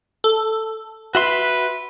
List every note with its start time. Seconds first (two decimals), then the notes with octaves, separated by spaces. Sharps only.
0.24 A4
1.15 F#4 B4 E5 C6